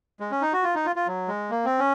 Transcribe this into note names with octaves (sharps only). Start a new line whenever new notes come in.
G#3
C#4
D#4
F#4
F4
D#4
F4
F4
F#3
G#3
A#3
C4
C#4